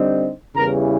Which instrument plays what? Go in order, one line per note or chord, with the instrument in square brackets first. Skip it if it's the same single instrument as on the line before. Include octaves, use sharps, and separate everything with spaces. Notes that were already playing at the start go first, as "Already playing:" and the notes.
Already playing: [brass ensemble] D3 G3 C4 D#4
E2 C#3 E3 G3 A#4 A#5